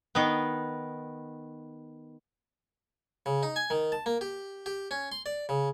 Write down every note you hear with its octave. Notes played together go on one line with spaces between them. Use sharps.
D#3 B3
C#3
D#4
G#5
D#3
A5
A#3
G4
G4
C#4
C6
D5
C#3